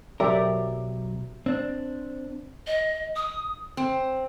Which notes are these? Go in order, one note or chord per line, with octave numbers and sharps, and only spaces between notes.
B1 F#3 G4 A#4 D5 E5
C4 D4
D#5
D#6
C4